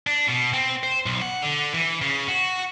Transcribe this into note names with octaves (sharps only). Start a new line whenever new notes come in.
D4
B2
C4
C5
B1
F#5
D3
E3
C#3
F#4